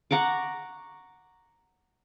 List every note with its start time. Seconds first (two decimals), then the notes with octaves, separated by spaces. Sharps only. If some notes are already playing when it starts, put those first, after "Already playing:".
0.11 F#5 A#5 C#6 D6